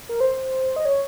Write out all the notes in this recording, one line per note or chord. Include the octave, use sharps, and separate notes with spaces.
A#4
C5
D#5
C#5